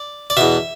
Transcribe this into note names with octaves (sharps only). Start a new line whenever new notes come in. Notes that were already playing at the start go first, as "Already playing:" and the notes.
Already playing: D5
D5
E2 B2 E5